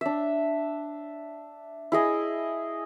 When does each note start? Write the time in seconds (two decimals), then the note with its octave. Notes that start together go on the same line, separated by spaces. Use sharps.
0.01 D4 E5
1.92 E4 G#4 D#5